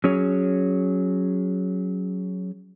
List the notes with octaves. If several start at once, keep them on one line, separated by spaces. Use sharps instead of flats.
F#3 C#4 G#4 C#5